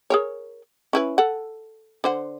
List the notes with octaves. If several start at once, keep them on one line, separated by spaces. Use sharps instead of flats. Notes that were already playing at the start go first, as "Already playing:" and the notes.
G#4 A#4 C#5
C#4 E4 B4
A4 F#5
D3 C5 F#5